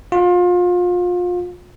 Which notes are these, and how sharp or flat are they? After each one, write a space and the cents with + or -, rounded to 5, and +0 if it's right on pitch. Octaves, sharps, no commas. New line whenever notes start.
F4 +30